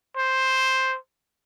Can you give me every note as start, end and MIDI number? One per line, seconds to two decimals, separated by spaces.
0.17 0.97 72